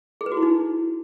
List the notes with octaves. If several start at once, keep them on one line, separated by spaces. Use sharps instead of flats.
G#4
B4
F#4
E4
D#4